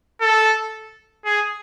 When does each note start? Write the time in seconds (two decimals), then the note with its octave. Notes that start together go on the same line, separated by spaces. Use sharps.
0.21 A4
1.25 G#4